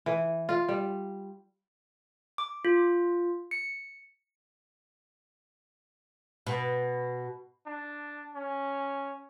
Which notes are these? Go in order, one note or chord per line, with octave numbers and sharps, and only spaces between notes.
E3
F4
G3
D6
F4
C#7
B2
D4
C#4